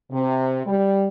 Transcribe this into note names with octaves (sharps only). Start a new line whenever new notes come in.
C3
G3